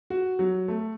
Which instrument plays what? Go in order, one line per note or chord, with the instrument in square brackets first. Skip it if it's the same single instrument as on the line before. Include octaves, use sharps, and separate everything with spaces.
[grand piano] F#4
F#3
A3